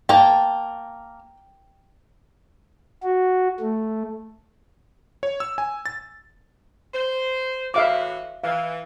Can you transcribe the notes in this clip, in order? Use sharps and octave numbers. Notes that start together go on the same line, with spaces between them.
A#3 G5 A5
F#4
A3
C#5
E6
G#5
A6
C5
A2 E3 F#4 E5 F5 D6
E3 F5